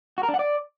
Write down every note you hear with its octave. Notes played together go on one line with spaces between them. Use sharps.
F#4
A#4
D4
F#5
D5